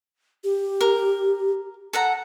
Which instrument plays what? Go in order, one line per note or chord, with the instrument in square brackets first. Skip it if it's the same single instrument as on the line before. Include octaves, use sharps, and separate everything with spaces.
[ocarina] G4
[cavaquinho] A#4
A4 F#5 A#5